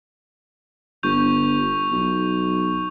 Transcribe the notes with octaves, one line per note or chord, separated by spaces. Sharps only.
G1 C#6 G6 F7
B1